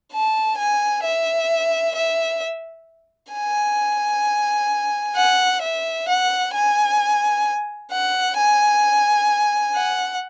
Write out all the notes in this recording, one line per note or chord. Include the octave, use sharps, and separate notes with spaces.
A5
G#5
E5
E5
G#5
F#5
E5
F#5
G#5
F#5
G#5
F#5